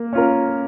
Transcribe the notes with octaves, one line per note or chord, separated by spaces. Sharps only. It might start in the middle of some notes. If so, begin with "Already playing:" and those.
Already playing: A#3
C#4 F4 A#4